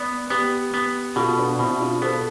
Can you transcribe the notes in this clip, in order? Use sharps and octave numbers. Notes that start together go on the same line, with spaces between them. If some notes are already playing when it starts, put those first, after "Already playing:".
Already playing: B3 B4 D5
B3 G4 B4
B3
B2 F4 A4
B3 D4
B2 C4 E4
E4
D4 F4
B3 A4 C5